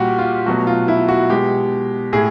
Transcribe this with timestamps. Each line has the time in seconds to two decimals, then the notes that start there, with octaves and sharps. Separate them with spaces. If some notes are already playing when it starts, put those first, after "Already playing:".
Already playing: A#2 G3 F#4 G4
0.18 F4
0.46 B2 F#3 A3 F#4
0.67 F4
0.88 E4
1.08 F#4
1.30 B2 G#3 G4
2.13 A2 G#4